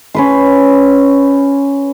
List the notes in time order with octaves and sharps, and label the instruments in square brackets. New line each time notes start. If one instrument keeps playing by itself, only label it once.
[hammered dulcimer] C#4 B4 C6